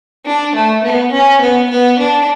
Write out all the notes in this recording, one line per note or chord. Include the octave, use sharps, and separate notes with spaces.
D4
A3
B3
C#4
B3
B3
D4